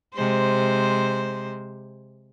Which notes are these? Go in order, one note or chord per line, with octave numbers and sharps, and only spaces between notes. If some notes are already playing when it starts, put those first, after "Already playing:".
C3 G#3 C5